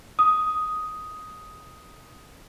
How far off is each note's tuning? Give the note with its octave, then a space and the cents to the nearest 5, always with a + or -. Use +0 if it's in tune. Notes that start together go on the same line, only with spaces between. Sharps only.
D#6 +5